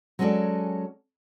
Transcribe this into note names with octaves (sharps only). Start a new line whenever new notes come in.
F#3 G#3 C#4 F#4 A4 D5